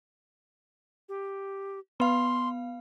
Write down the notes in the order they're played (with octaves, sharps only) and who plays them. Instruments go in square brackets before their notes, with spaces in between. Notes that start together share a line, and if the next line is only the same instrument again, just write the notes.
[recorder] G4
[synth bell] B3 F5 [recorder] C6